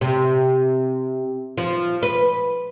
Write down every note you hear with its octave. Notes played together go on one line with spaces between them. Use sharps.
C3
F3
B4